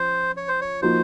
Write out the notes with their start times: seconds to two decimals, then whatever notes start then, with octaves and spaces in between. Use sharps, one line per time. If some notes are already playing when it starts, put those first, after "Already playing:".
Already playing: F3 C#4 C5
0.37 C#5
0.48 C5
0.61 C#5
0.82 F3 A#3 D#4 F#4 C5